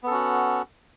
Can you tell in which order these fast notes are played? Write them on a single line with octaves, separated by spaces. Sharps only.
B3 A4 C#4 F#4